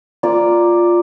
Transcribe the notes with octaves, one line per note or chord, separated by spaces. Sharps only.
A#3 F4 D5